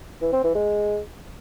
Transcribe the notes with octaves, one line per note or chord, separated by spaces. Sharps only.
E3
C4
E3
G#3